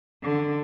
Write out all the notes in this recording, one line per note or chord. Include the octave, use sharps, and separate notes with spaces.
D3